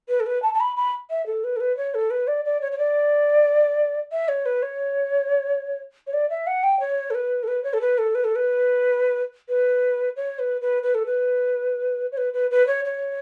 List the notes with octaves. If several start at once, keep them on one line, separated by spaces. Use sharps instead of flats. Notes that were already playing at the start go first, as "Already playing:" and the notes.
B4
A4
B4
A5
A5
B5
B5
E5
A4
B4
A4
B4
C#5
A4
B4
D5
D5
C#5
C#5
D5
E5
C#5
B4
C#5
C#5
D5
E5
F#5
G5
C#5
A4
B4
A4
B4
C#5
A4
B4
A4
B4
A4
B4
B4
C#5
B4
B4
B4
A4
B4
C#5
B4
B4
B4
C#5
C#5